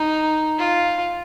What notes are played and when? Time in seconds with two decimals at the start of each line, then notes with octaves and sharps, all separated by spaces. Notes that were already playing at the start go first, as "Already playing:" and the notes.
Already playing: D#4
0.58 F4